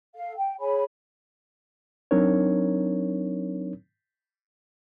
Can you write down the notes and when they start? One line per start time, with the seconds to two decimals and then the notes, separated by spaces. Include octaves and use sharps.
0.14 A4 F5
0.38 G5
0.60 G#4 C#5 G#5 B5
2.11 F#3 C4 D4 D#4 A#4 C#5